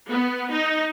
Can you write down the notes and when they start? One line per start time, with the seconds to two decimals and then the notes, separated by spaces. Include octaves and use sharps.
0.10 B3
0.51 D#4